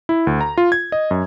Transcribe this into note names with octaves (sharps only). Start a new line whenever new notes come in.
E4
D2
A#5
F4
G#6
D#5
F#2